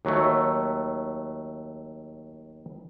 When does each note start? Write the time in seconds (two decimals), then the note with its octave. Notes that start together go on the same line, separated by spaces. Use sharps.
0.05 D#2 F#3 A3